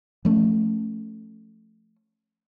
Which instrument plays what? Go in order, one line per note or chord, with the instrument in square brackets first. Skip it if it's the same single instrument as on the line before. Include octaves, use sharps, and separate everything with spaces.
[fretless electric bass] F3 A3 C#4